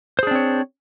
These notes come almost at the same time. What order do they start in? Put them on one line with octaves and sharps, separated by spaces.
C5 G#4 D4 C4 C#5